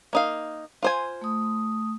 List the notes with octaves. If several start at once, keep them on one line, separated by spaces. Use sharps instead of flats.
A#3 D#4 F5
F4 C5 G#5
A3 D#6